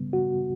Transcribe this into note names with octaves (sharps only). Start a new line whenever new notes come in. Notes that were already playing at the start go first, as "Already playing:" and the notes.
Already playing: C#3 G3 B3
F#4